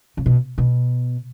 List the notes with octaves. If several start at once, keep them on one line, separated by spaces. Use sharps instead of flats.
C#3
B2
B2